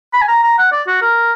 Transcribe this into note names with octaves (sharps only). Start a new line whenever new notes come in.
B5
G#5
A#5
A#5
F#5
D5
F#4
A#4